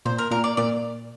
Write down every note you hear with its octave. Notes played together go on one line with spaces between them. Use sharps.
A#2 C5
A#4
A#2 A#4
D5
A#2 D5